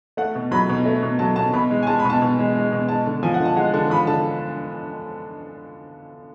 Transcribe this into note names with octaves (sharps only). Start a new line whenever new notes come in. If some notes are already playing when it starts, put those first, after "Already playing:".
A3 F#5
B2
F#3 B5
B2
A3
B2
F#3 A5
B2 A5
B2 B5
G#3
G#5
G#3 A5
B5
B2 A5
B2
G#3
G#3
B2
G#3 A5
D3
F3 G#5
F#5
D3
A5
G#3 F#5
D3 A5
F3 B5
D3 A5